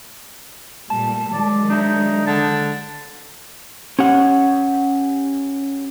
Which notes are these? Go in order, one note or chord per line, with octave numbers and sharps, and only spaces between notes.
A#2 G3 A3 A5
D#3 F#3 G#3 D5
D4 D#4 E5
D3 A5
C#4 G4 F#5